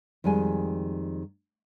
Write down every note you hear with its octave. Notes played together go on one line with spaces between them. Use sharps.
F2 D#3 G3 G#3 G#5